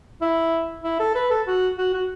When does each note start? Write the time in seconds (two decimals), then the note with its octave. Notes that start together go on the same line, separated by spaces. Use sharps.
0.21 E4
0.84 E4
0.99 A4
1.15 B4
1.30 A4
1.47 F#4
1.78 F#4
1.93 F#4